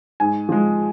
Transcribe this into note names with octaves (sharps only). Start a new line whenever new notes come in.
G#2 G#5
F3 G#3